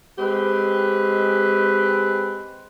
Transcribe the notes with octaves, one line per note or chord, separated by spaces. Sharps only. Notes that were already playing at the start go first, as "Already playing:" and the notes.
G#3 C4 G4 B4